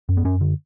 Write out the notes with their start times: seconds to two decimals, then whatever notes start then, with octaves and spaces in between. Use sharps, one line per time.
0.09 F#2
0.17 B3
0.24 F#2 C#4
0.41 D3